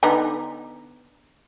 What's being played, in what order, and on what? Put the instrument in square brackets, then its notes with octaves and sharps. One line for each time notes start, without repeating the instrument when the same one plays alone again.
[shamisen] D3 B3 D#4